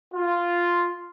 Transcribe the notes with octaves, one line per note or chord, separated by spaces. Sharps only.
F4